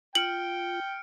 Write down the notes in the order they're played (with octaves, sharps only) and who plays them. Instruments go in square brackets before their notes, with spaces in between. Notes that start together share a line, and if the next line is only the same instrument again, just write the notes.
[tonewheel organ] F4 [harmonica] G5 [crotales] F6 C#7 D7 [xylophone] F#7